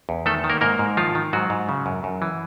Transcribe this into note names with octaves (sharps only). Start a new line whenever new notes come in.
E2
D#3 A3 A4
D#3
A#3 A#4
G#2 A#3 A#4
G#2
D#3 F3 F4
D#3
G#2 F#3 F#4
G#2
C#3
F#2
F#2
E3